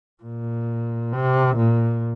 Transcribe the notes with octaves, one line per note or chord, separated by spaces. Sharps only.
A#2
C3
A#2